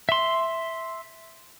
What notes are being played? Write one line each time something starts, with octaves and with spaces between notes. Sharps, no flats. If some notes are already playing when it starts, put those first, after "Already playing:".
E5 C6